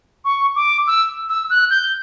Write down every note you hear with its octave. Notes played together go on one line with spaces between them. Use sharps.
C#6
D6
E6
E6
F#6
G6